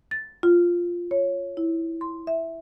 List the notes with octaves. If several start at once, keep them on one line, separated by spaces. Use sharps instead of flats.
A6
F4
C#5
E4
C6
E5